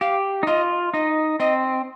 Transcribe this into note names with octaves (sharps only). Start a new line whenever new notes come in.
G4 F5
D#4
F4 D#5
D#4 D#5
C4 D#5